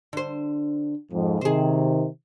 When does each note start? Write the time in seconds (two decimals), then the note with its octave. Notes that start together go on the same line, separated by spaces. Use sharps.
0.13 D3 C5
1.12 F2 G#2
1.41 C3 D#3 G#4 C5